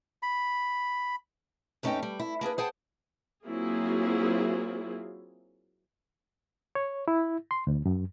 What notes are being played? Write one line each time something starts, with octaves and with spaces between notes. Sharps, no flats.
B5
F#2 A3 C#4 D#4 B4 G5
G3
E4
A#3 D4 G#4 B4
G#4 C5 F#5 G5 A5
F#3 A#3 C4 E4 F4 G#4
C#5
E4
C6
D2
F#2